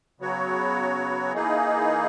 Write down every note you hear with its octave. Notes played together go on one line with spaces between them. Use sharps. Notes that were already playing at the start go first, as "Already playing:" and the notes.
C#3 F#3 B3 F#4 C#5
E3 A#3 D#4 G#4